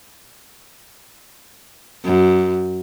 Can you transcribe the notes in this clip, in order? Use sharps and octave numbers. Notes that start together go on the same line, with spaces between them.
F#2